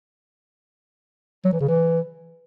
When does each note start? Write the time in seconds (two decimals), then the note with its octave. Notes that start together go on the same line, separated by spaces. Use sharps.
1.45 F#3
1.53 E3
1.61 C#3
1.68 E3